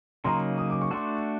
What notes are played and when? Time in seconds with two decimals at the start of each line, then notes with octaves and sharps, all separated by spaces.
0.24 C#3 F#3 A#3 D#4 G#4 A#5 C6
0.58 D#6
0.70 D6
0.81 C#6
0.91 A3 D4 F#4 A4 C6 D6